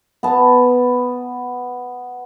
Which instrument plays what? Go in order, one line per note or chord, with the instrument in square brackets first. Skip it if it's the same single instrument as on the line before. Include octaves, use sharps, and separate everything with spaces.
[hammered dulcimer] B3 A5